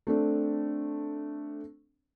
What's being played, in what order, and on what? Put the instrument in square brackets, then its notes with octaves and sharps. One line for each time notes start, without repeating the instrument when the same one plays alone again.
[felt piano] A3 C4 D4